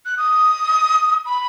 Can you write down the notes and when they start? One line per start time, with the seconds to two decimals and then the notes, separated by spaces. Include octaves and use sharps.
0.06 F#6
0.18 D#6
1.26 B5